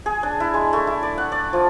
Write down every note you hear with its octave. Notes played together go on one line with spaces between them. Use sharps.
G#4
D4
E4
G#3
A3
E4
D5
F#5
D5
F3